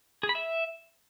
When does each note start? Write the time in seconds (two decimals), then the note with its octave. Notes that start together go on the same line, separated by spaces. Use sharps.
0.23 G#4
0.29 B5
0.35 E5